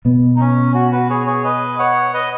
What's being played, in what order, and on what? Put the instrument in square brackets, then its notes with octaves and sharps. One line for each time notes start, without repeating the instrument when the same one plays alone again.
[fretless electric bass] B2 B3
[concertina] D#4
C#4
F#4
F#4 B4
G#4 C#5
G#4 C#5
B4 D#5
C#5 F#5
B4 D#5